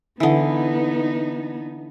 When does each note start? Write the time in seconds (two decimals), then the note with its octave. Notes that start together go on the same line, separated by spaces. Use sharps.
0.20 D3 E3 B3 D#4